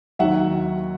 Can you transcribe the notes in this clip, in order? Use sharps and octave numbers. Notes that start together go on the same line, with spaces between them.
D#2 D#3 F#3 E5 F#5